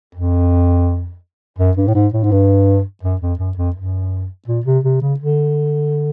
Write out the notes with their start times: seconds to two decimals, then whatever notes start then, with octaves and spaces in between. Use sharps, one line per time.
0.15 F2
1.59 F#2
1.77 G2
1.88 A2
1.95 G#2
2.13 A2
2.24 G#2
2.31 G2
3.03 F#2
3.21 F2
3.39 F#2
3.57 F2
3.76 F#2
4.48 A#2
4.66 C3
4.84 C3
5.01 C#3
5.19 D3